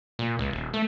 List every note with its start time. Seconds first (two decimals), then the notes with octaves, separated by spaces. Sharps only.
0.19 A#2
0.39 C#2
0.51 D#1
0.74 A3